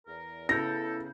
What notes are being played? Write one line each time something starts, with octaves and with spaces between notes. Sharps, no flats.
E2 A#4
C#3 B3 E4 A4 G6 A#6